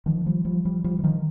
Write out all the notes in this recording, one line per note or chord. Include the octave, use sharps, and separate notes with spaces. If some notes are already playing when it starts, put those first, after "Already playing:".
D#3 F3
F3 G3
F3 G3
F3 G3
F3 G3
E3
D#3 F3